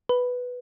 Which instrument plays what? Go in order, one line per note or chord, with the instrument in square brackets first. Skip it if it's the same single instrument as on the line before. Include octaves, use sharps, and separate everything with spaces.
[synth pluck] B4